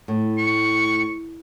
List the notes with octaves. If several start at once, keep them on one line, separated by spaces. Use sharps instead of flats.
A2
C#6